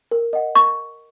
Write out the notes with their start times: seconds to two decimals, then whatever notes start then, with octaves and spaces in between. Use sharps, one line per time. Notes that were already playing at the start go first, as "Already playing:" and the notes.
0.11 A#4
0.33 D#5 F#5
0.55 A#4 C#6